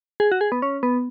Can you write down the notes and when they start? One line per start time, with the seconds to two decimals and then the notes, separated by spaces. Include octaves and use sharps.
0.20 G#4
0.32 F#4
0.41 G#4
0.52 B3
0.62 C#4
0.83 B3